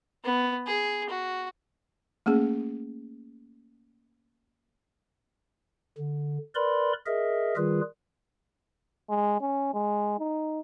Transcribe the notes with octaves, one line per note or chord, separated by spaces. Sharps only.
B3
G#4
F#4
A3 A#3 C#4 G#4
D3
A#4 B4 D5 B5 C6
G#4 A#4 D#5 E5
D#3 G3 F4 G#4 B4
G#3
C#4
G#3
D#4